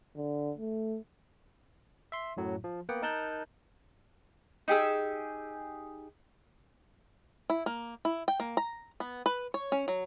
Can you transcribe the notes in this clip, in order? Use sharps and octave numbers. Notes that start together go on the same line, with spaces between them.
D3
A3
E5 C6
F#2 A2 F#3
F3
A#3 B3 F#5 G5
D#4 A#4 A5 F#6 G6
D#4 G4 G#4 E6
E4
A#3
E4
G5
A#3
A#5
B3
B4
C#5
C#4
F#3